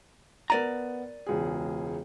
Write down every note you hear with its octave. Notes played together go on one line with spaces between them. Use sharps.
B3 A#4 D5 A#5 D#7
E1 C#2 G#4